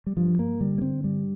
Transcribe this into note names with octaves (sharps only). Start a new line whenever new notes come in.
G3
G2 F3
G2 A#3
D3 G3
A#3
D3 C4
G2 G3